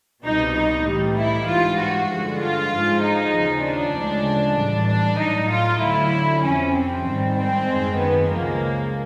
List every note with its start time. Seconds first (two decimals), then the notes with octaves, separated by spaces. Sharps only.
0.24 C2 B2 G3 D#4
0.55 D#4
0.86 A2 E3 G3
1.17 E4
1.47 G#2 E3 G3 F4
1.79 F#4
2.09 G2 D3 F3 G#3
2.41 F4
2.72 G#2 F3 G#3
3.03 D#4
3.34 D#2 C#3 F3
3.64 D4
3.95 D2 C#3 F3 G#3
4.58 A2 E3 G3
4.88 D4
5.19 A2 F#3 D#4
5.51 F4
5.81 D2 D3 F#3 E4
6.43 F2 C3 F3 C#4
6.75 C4
7.05 G#2 D#3 G3
7.37 C4
7.67 F#2 D#3 G#3
7.98 B3
8.29 C#2 C#3 F3 G#3 A#3